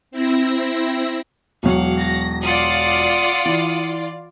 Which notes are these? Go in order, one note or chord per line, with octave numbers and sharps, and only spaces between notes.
C4 E4 E6 A#6
E1 F#3 F5 F#5
A#6
F4 D5 F#5 D#6
E3